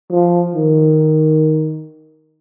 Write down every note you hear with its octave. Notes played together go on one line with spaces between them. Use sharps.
F3
D#3